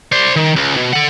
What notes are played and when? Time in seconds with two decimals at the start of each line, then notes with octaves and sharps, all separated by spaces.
0.12 C5 D5
0.36 D#3
0.56 C#2
0.77 B2
0.94 A4 F#5